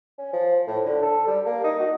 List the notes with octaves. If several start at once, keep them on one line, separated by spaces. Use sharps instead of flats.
C#4
F3
A2
D3
A4
G3
A#3
D#4
F#4